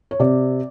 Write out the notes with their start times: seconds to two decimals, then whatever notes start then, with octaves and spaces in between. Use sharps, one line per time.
0.11 C#5
0.20 C3 D5